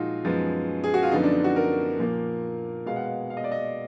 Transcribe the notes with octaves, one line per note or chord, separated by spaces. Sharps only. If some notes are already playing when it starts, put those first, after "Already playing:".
Already playing: A#2 F3 G#3 D#4 F4 F#4
F#2 F3 G#3 B3
G#4
F#4
F4
F#2 D3 F3 B3 D#4
D4
D#4
F#4
A#4
A#2 F3 A#3
B2 G#3 B3 F5
F#5
F5
F5
D#5
D5
D#5